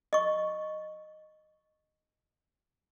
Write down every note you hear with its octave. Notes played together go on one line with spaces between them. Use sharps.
D#5 C#6